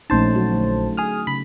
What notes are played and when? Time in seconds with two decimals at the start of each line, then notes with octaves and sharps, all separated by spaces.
0.10 A#1 A3 C#4 D#4 C5 A5
0.35 F#3 F#4
0.52 D3 A3
0.97 G#4 D#6 F6
1.27 C#3 B5